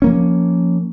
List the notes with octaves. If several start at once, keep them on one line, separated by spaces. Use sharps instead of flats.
F3 A#3 C#4